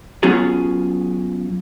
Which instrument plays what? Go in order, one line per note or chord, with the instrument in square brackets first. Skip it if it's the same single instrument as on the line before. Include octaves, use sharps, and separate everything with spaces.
[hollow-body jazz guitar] F#3 B3 C#4 F4 G#4